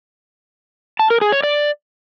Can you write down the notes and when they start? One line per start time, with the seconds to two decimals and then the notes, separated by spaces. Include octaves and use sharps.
0.99 A5
1.10 A#4
1.21 G#4
1.32 C#5
1.43 D5